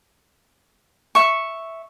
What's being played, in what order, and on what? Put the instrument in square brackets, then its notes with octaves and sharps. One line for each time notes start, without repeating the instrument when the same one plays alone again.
[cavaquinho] E5 C#6